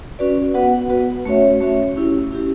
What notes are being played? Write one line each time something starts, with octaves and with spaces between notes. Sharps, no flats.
C#4 F#4 B4 D5
B3 F#4 B4 F#5
B3 F#4 B4 F#5
A3 C#4 F#4 C#5 E5
A3 C#4 F#4 C#5 E5
C#4 E4 G4
C#4 E4 G4